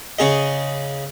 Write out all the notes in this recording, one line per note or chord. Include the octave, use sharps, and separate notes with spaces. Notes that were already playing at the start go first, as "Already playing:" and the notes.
C#3 G#4 D#5